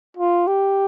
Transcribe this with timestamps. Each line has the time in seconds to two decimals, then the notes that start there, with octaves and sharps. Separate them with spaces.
0.17 F4
0.47 G4